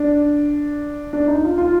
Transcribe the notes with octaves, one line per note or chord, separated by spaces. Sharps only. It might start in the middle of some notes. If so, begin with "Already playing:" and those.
Already playing: D4
D4
D#4
F4
F4